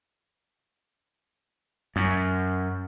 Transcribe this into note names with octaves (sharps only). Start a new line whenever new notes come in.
F#2